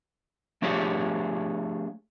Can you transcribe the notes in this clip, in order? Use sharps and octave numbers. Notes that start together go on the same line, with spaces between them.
F3 A3 D4 G4 G#4 C#5